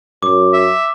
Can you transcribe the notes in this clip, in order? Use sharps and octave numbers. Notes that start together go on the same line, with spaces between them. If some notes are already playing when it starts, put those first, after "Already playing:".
F#2 D6
E5